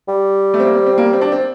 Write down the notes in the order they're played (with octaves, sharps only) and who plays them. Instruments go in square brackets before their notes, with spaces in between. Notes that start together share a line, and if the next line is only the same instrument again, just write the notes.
[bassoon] G3
[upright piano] A3
C4
A#3
C4
C4
A#3
C4
D4
C4